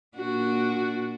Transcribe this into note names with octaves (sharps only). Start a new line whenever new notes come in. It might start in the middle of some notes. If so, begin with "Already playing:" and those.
A#2 D4 F#4